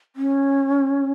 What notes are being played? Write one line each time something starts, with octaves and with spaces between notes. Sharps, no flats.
C#4